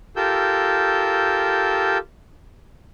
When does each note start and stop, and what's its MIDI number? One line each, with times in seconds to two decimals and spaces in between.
0.16 1.98 65
0.16 1.98 67
0.16 1.98 69
0.16 1.98 70
0.16 1.98 88
0.16 1.98 91